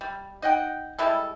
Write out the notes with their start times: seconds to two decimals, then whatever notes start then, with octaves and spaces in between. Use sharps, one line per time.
0.01 G3
0.42 D#4 D#5 F#5 G5
0.99 G3 G#3 E4 A4